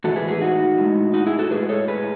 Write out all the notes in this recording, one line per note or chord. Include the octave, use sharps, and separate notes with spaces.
A2 E3 G#3 F#4 A4
G#4 B4
G#4 B4
D#4 F#4
A2 G#3
D#4 F#4
E4 G#4
F#4 A4
A2 G#3 G#4 B4
A4 C#5
G#4 B4